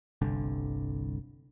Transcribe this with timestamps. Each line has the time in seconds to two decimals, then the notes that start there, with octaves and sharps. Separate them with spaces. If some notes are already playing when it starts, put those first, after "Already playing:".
0.22 G1 C2 D3